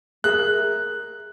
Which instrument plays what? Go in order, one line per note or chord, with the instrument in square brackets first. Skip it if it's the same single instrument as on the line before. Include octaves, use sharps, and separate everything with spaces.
[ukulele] G#4 A#4 E5 [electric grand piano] F#6